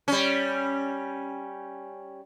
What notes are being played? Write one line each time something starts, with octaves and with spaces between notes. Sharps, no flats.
G3 C#4